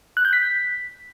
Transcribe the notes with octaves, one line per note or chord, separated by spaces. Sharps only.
F#6
G6
B6